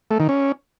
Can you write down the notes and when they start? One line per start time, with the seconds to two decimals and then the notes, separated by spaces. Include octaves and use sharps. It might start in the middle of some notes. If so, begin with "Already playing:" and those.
0.11 A3
0.20 D#3
0.29 C#4